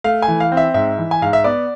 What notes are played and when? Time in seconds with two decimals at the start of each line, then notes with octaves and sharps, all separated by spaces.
0.04 A3 F5
0.22 G#5
0.28 E3
0.40 F5
0.52 C4
0.57 E5
0.74 G#2 E5
0.98 E3
1.11 G#5
1.22 G#2 F5
1.33 E5
1.44 B3 D5